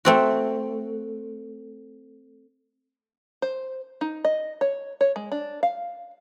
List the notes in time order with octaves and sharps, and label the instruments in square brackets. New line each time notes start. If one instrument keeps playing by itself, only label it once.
[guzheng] A3 C4 F#4
[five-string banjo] C5
D#4
D#5
C#5
C#5
G#3
D4
F5